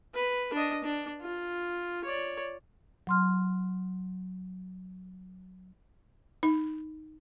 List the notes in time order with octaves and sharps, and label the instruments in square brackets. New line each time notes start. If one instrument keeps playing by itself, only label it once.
[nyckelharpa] B4
D4 D#5
D4
F4
C#5 D5
[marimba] F#3 C6 F6
[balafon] D#4